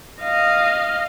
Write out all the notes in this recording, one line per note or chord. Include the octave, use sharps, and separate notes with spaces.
D#5 F5